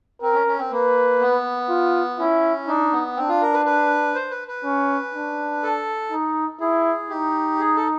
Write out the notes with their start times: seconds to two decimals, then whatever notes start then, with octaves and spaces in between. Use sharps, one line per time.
0.22 C4 A#4
0.34 C#4
0.47 C#4
0.59 C4
0.71 A#3 B4
1.21 B3
1.69 F4
2.19 C#4 E4
2.68 D4 D#4
2.93 B3
3.17 C4 D4
3.29 F4
3.42 A#4
3.54 B4
3.65 B4
4.15 C5
4.31 B4
4.48 B4
4.65 C#4
5.14 D4
5.63 A4
6.12 D#4
6.61 E4 G#4
7.10 D#4 G4
7.59 G#4
7.76 A4